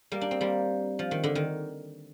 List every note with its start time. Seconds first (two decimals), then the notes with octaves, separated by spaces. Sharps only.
0.12 G3 A#3
0.21 D4
0.31 C4
0.41 G3 A#3
0.99 F3
1.11 D#3
1.23 D3
1.35 D#3